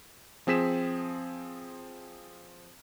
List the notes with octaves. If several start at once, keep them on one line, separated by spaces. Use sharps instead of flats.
F3 C4 G#4 B6 E7